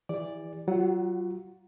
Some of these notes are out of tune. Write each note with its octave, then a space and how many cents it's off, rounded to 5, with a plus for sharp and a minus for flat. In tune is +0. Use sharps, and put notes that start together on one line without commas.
E3 -10 G4 +40 D5 +0
F#3 +30 F4 +0 F#5 +0